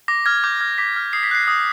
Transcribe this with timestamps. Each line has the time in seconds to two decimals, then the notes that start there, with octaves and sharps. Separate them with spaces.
0.08 D6 A#6
0.26 F6 G#6
0.44 D6 G6
0.61 F6 G#6
0.78 D6 B6
0.96 F6
1.13 D#6 C7
1.23 B6
1.31 F#6 C7
1.48 D#6